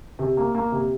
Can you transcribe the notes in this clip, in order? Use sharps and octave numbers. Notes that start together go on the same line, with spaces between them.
C3
A#3
A#3
C3